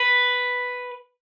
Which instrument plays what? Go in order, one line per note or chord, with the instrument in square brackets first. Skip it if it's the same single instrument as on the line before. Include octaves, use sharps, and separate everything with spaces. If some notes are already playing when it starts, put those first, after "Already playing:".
Already playing: [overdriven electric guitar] B4